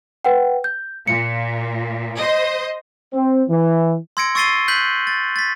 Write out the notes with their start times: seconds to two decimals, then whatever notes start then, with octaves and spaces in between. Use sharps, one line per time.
0.25 B4 F#5 G5
0.64 G6
1.08 A#2 C#7
2.18 C5 D#5
3.13 C4
3.49 E3
4.17 C6 E6 G#6 A#6 C#7 D7
4.35 C#6 E6 A6 C7 D#7 G7
4.68 F#6 G6 B6 F#7
5.07 A6
5.36 A6 B6